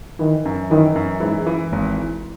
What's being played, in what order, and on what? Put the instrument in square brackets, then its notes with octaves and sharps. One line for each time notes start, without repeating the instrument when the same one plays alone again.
[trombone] D#3 [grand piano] E3
[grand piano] F#2
[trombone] D#3 [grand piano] E3
[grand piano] F#2
[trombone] G#2 [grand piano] E3
[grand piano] E3
G#1